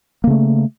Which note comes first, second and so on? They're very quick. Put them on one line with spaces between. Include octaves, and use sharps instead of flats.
A#3 C#3 A3